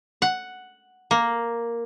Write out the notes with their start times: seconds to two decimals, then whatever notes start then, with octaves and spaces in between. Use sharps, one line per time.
0.22 F#5
1.11 A#3